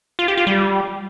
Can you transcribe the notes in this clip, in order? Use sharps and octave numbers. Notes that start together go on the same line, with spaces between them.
F4
G4
F4
G3